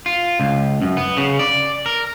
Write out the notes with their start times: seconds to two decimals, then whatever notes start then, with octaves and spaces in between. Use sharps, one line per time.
0.06 F4
0.40 C#2
0.82 F#2
0.97 B3
1.17 C#3
1.39 D5
1.86 A#4